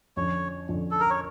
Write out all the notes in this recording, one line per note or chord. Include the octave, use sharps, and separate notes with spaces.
F2 D3 F3 C#4 C#5
F2 D3 F3 C#4
A4
A#4
C#5